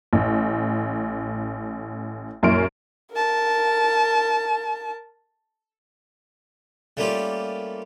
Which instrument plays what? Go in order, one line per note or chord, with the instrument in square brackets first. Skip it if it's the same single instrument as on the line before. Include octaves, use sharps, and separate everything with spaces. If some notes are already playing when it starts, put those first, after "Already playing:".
[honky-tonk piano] A1
A#1 F#2 E4 C6 F6 D7
[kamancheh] A#4 A5
[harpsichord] G3 A3 A#3 C#4 F4 G4